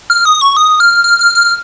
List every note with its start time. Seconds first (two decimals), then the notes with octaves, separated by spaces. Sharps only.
0.10 F6
0.25 D#6
0.41 C#6
0.57 D#6
0.80 F6
1.04 F6
1.19 F6
1.35 F6